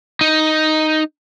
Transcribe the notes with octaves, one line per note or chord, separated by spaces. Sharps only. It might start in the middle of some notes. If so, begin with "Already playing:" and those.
D#4